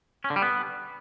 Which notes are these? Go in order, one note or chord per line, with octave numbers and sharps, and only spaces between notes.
C#4
D3
G3
B3